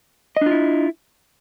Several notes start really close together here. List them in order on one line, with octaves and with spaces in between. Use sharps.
D#5 D4 F4 E4